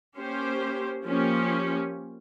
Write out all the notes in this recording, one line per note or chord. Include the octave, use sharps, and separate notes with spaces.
A#3 C#4 G4 C5
F3 A#3 C#4 G4